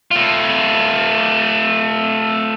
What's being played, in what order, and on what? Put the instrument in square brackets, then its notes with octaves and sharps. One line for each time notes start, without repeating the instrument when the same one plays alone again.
[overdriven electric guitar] A3 F4